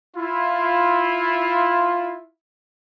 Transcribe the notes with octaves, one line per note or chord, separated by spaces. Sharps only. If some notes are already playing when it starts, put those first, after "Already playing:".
E4 F4